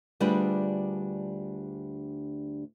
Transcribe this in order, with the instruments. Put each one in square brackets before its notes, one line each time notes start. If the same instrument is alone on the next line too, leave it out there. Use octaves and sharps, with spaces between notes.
[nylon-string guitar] D2 G3 D4 F4 G#4 B4